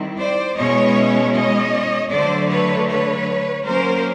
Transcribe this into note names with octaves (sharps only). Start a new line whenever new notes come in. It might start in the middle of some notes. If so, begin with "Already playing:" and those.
Already playing: D#3 G3 C4 E4
C5 D5
B2 G#3 C#4 E4 C#5 D#5
C#5 D#5
D3 F#3 A3 C5 D5
B4 C#5
B4 C#5
F#3 A#3 C#4 A#4 C5